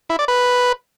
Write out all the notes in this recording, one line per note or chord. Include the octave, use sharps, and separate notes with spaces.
E4
D5
B4